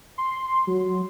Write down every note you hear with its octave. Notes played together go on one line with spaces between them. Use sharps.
C6
F#3